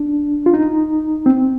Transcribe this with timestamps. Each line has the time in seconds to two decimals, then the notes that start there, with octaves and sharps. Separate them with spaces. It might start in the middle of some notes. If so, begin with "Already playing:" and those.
Already playing: D4
0.46 F4
0.54 D#4
1.26 C4